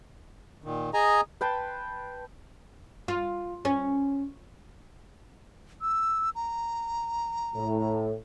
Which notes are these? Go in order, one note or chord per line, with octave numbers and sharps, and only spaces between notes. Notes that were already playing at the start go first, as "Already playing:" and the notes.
A#2 D#3
G#4 D#5 G#5 A#5
B4 G5 A5 C6
F4
C#4
E6
A#5
A2